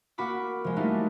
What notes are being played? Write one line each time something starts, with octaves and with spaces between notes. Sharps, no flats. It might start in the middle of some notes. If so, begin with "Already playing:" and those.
A#3 F#4 F#5 B5 D6
F3 G#3
G3 A3 A#3 D#4 E4 F#4